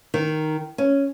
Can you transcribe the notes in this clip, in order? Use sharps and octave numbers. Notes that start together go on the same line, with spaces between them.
D#3
C#4